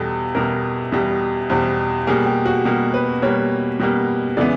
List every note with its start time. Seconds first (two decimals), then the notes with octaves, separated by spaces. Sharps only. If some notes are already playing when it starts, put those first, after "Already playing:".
Already playing: E2 B2 G3 A4
0.35 E2 B2 G3 A#4
0.92 E2 B2 G3
1.50 E2 B2 G3 C5
2.07 B2 G3 A#3 G#4
2.26 G4
2.46 F#4
2.65 B2 G3 A#3
2.94 B4
3.22 B2 G3 A#3 C#5
3.80 B2 G3 A#3
4.37 C#3 E3 G#3 B3 D5